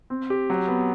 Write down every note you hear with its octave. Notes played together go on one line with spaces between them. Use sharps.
C4
G4
F#3
B3